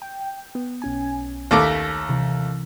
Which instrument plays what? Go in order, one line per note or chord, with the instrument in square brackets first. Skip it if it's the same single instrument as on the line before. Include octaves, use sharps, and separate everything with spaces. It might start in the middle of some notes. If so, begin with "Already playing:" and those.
[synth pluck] G5
B3
B1 C#4 G#5
[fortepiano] D#2 A3 D6 [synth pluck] A#6 B6
[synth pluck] C3 E3